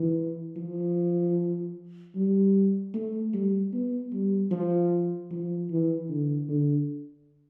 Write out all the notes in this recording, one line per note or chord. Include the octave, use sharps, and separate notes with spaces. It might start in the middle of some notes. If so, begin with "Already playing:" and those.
Already playing: E3
F3
G3
A3
G3
B3
G3
F3
F3
E3
D3
D3